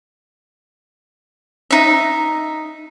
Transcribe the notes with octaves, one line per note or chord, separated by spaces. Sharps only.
D#4 E5